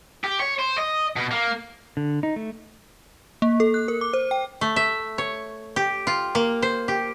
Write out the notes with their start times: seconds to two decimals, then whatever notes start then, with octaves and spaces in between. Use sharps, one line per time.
0.24 G4
0.40 C#5
0.59 C5
0.78 D#5
1.16 B2
1.31 A#3
1.97 D3
2.23 D#4
2.36 A3
3.42 A#3
3.60 A4
3.74 F#6
3.88 A#4
4.01 D6
4.13 C5
4.31 G5
4.61 A3
4.76 E5
5.18 C#5
5.76 G4
6.07 F4
6.35 A#3
6.62 C5
6.88 G4